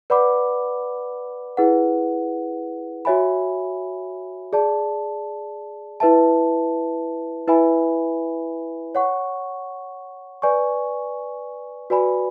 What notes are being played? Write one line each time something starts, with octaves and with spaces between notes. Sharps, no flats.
B4 D5 F#5 B5 D6
E4 G#4 B4 F#5
F#4 C#5 E5 G#5 B5
G#4 D5 A5
E4 B4 E5 A5
E4 B4 E5 G#5 B5
C#5 F#5 C#6
B4 D5 G#5 C#6
F#4 B4 D5 G#5 B5